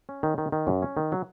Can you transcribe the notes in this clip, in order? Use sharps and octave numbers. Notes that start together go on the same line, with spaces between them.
C#4
D#3
D#3
D#3
F#2
C#4
D#3
F#3